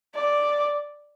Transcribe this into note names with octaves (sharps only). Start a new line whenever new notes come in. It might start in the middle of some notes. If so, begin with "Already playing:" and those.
D5